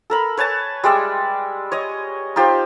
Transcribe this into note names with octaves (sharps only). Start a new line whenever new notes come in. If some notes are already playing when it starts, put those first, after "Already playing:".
A4 A#4 B5
B4 C#5 G#5 A5
G3 G#3 D5 E5
C#5 D#5 D#6
D#4 F4 G4 C5